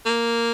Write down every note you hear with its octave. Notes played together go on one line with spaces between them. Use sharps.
A#3